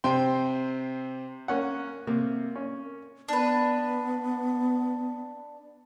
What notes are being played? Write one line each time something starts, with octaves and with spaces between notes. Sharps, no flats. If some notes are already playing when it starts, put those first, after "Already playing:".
C3 C4 G5 C6
A#3 C#4 F#5
C3 A#3
C#4
B3 D4 B4